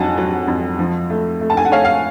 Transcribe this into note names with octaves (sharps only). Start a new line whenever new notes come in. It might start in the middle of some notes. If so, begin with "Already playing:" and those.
Already playing: F2 F#3 F#5 G#5 A5
F#3
F2
F3
A3
A3
A5
G#5
F#5
A3 C#5 F5
F5